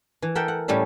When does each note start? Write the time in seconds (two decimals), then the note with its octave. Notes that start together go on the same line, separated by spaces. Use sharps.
0.22 E3
0.35 A4 A#4 E5 F#5 G5
0.48 F#5
0.68 A2 G3 A3 C#4 E5